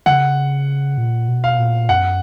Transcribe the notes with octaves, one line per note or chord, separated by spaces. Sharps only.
C#3 F#5
A#2
B2
F5
A#2
F#2 F#5